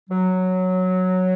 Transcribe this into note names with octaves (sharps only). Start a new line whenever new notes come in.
F#3